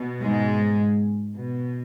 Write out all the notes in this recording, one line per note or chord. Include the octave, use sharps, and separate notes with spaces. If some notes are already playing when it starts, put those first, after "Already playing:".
Already playing: B2
G#2 G#3
B2